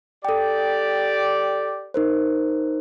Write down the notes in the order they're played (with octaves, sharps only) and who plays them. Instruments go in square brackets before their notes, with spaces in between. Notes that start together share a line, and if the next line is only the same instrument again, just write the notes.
[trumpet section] G4 D5 [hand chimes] A4 G5
[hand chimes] D#4 A#4 C5